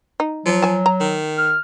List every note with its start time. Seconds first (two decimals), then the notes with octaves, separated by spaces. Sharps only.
0.20 D#4
0.46 F3 F#3
0.62 G#5 A5
0.86 A#5
1.01 D#3
1.38 F6